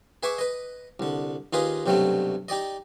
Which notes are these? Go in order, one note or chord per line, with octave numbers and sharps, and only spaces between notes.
G#4 B4 E5 G#5 C#6 D6
B4 D#5
C2 D3
D#2 D#4 F4 G#4 B4 D#6
B1 G2 C3 F#3 G3 A3
D#4 G4 D5 D#5